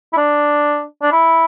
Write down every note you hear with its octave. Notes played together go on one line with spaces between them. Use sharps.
E4
D4
D4
E4